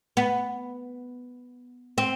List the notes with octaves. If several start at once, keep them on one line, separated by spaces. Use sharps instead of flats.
B3
C4